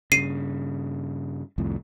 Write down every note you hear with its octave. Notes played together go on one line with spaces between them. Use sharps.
G2 C#3 C7 D#7
C2 F2 A2